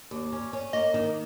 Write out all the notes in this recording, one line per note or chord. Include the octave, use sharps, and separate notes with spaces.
D#2
C#4
C#4
A#3 D#5
D#3